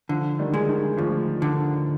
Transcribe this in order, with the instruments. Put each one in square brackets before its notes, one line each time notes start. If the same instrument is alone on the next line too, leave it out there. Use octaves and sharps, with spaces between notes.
[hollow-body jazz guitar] D3 [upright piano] F3
[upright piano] D#3 G3
[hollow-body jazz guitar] G#3
[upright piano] D#3
[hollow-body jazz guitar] D2 [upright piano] F3
[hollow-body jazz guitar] D3